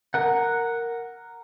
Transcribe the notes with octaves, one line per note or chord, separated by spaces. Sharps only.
A#4 F#5